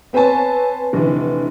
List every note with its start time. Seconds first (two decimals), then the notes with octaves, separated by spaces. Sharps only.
0.13 B3 C4 B4 C#5 G#5 A5
0.93 F1 D3 E3